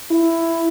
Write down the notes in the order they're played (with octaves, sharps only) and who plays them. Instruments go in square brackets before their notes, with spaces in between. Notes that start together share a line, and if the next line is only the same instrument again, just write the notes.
[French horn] E4